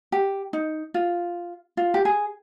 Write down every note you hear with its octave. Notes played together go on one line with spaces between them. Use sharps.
G4
D#4
F4
F4
G4
G#4